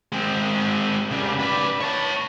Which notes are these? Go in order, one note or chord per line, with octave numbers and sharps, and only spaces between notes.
G#3 C4
C#3 G3
B4 D5
C#5 A5